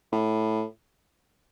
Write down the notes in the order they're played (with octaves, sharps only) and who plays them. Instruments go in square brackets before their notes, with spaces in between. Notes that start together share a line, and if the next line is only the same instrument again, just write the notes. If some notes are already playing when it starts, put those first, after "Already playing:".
[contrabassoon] A2